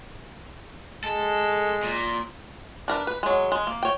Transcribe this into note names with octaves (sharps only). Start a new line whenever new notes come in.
G#3 A4
A#2
D4 A#4 B4
B4
F#3 G#3
G#3
A#3
C#5 G5